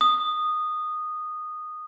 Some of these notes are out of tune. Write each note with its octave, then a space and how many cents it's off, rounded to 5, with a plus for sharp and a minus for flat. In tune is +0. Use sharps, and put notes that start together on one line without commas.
D#6 -15